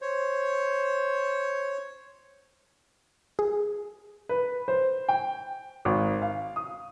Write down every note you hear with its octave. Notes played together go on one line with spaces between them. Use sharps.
C5 C#5
G#4
B4
C5
G5
G#1
F5
D#6